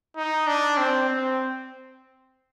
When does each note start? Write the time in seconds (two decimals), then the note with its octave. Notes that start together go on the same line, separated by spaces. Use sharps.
0.16 D#4
0.47 D4
0.78 C4
1.09 C4